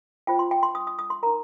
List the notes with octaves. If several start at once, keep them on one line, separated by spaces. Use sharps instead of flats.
F4 C5 G5
C6
G5
C6
D#6
D#6
D#6
C6
D#4 A#4 A#5